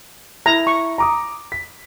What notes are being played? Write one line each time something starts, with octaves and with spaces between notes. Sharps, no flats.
E4 A#5
C#6
A#5 D6 D#6
B6